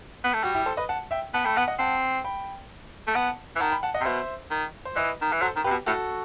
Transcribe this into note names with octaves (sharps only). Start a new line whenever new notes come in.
B3
A3
G3 F#4
E4 G4
A4 C5
B4 D#5
F#5 A5
E5 G5
B3 F#5 A5
A3 G5 B5
B3 F#5 A5
D#5 F#5
C4 F#5 A5
G5 B5
A3
B3 F#5 A5
E3
D#3 F#5 A5
G5 B5
F#5 A5
D#5 F#5
C3
B2 C5 E5
D#3
C5
E3 B4 D#5
D#3
E3
F#3 A4 C5
D#3
C3 G4 B4
B2
A2 F#4 A4